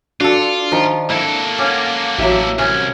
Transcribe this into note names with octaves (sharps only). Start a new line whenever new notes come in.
D4 F4 F#4 A4
D#3 F3
A#3 E4 A4
C#4 F5 F#5 D6
A1 F#3 E4 G4 E5
C2 C#4